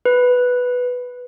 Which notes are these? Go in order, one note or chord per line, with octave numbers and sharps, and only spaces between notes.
B4